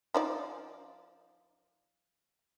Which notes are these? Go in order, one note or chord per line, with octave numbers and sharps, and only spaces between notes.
F3 D#4 D5